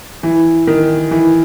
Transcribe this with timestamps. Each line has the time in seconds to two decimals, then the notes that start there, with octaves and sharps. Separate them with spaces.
0.23 E3
0.67 D#3
1.11 E3